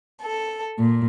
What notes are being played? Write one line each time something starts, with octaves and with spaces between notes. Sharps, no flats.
A4
A#2